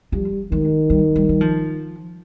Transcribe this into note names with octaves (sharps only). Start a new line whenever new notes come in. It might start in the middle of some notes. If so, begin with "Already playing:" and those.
F3 G3
D#3 G#3
G3
G3
G3
F3